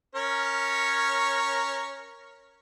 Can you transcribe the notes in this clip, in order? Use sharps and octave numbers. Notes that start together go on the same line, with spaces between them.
C#4 A#4 C#5